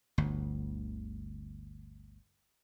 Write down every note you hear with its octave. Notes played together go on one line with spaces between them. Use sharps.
G1 D2